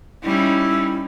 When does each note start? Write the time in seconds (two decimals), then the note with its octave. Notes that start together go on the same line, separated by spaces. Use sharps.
0.24 G3 C#4 D#4 E4